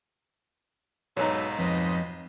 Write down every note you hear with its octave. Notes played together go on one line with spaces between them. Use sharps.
B1 G#2 F#3 D#4 A4 B4 C#5 A#5
F2 B4 C5 D#5